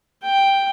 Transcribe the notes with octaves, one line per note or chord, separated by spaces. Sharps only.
G5